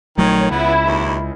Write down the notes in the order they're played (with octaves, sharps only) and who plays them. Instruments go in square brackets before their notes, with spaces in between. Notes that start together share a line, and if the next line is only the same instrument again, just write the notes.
[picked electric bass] A#1 F#3 A3 [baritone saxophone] D#3 [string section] C#5
[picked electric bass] C#2 [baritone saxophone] B3 [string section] E4
[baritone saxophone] D#2